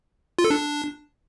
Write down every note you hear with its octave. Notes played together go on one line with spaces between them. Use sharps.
F4
A4
D4